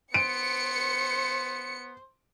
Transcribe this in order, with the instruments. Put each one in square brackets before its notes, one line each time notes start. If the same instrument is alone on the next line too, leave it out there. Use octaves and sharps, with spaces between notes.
[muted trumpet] B3 [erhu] C5 [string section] C#7 [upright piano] D7